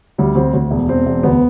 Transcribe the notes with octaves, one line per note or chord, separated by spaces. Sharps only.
D2 G3
D2 C4
D2
E1
E1 C4
E1
D2 B3